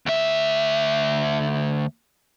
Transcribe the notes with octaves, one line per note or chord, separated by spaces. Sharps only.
D2 E5